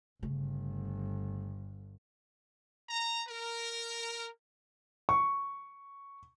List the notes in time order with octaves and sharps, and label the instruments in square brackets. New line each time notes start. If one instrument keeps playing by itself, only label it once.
[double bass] G1 [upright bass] C#3 A3
[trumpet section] A#5
A#4
[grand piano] C#6